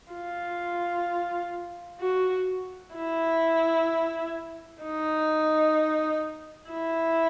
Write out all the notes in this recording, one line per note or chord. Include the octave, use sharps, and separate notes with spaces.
F4
F#4
E4
D#4
E4